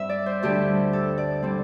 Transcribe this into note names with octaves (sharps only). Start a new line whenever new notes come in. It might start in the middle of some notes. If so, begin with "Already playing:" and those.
Already playing: G2 G3 C4 E5
D5
C5
D2 D3 G3 D4 G4
A4
D5
D3 G3 C4